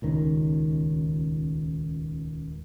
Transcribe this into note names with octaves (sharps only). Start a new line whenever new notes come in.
D#1 C#2 D#3